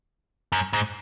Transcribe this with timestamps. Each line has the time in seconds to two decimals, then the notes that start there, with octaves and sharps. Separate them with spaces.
0.52 F#2
0.73 G#2